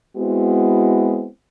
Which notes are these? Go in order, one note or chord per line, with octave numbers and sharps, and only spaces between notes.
G#3 B3 C4 E4 F#4